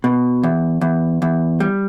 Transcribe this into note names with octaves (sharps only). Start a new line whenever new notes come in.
B2
E2
E2
E2
G3